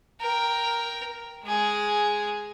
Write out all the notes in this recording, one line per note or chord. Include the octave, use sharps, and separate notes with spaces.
A#4 G5
G#3 G#4